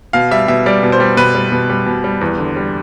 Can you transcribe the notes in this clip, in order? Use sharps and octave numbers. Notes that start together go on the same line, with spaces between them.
B2 F5
G3 E5
B2 E5
G3 D5
B2
C5
G3
B2 B4
G3
B2
G3
B2
G3
E2
D3
G3